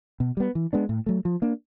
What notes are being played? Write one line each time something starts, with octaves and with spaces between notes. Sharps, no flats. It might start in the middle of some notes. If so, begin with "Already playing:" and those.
B2
G3 B3
E3
G#3 B3 D4
A2
F#3 A3
F3
A#3 D4